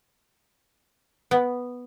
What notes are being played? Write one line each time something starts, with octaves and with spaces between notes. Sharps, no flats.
B3